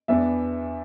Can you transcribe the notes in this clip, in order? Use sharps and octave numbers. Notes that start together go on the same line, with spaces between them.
E2 E3 B3 D4 E5